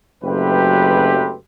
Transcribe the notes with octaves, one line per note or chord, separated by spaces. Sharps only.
F#1 F#3 A3 C4 G4 B4